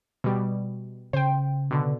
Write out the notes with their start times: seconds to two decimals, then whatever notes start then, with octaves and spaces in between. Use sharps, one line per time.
0.24 B2 G3
1.13 C#3 C5 G5
1.71 B2 D3